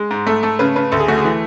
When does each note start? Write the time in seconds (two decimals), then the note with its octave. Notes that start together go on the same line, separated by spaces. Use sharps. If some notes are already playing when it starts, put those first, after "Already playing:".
Already playing: G#3
0.11 G#2
0.27 A3 A4
0.43 A3 A4
0.59 C#3 B4
0.76 C#3 B4
0.92 D2 A4
1.00 G#4
1.08 A3 F#4
1.17 G#4
1.24 E3